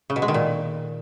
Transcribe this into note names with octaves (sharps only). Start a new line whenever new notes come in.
C#3
B2
G#3
D#3
A#2